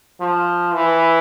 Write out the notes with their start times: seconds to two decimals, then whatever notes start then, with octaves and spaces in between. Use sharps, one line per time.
0.21 F3
0.74 E3